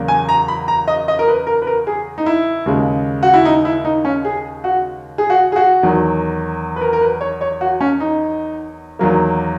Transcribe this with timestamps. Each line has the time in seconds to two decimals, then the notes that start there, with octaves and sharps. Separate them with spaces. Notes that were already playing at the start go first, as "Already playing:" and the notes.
Already playing: E2 C#3 F#3 A#3
0.08 G#5
0.29 A#5
0.48 B5
0.68 A#5
0.88 D#5
1.08 D#5
1.19 A#4
1.28 B4
1.47 A#4
1.62 B4
1.67 A#4
1.87 G#4
2.18 D#4
2.26 E4
2.66 D#2 C#3 G#3
3.23 F#4
3.34 E4
3.45 D#4
3.65 E4
3.85 D#4
4.05 C#4
4.25 G#4
4.64 F#4
5.18 G#4
5.30 F#4
5.52 G#4
5.56 F#4
5.83 E2 D#3 F#3
6.76 B4
6.81 A#4
6.93 A#4
7.01 B4
7.21 C#5
7.41 C#5
7.61 F#4
7.81 C#4
8.00 D#4
8.99 E2 D#3 F#3 A#3